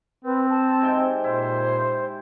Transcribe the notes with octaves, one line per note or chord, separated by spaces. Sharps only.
C4 B4
A5
G#2 C3 G5
A#2 E4 C5